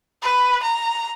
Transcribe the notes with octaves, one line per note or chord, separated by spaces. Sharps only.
B4
A#5